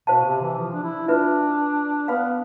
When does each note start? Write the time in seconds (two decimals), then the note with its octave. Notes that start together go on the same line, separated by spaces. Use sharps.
0.07 B2 C5 F5 A5
0.25 C3
0.42 E3
0.58 F3
0.73 D4
0.83 E4
1.08 D4 F4 B4 E5
2.08 B3 B4 F5 B5